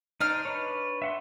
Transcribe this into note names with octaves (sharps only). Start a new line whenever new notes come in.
D4 D#4 C5 F6
B4 C#5
E5 F#5 C6